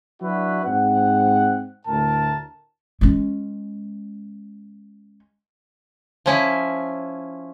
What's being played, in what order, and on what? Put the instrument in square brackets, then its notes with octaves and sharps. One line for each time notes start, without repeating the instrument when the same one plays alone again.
[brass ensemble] F#3 D4 E4 F#4 B4
G#2 C4 F#5
D2 A2 A#4 A5
[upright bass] G#3 C#4
[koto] F3 C#4 E4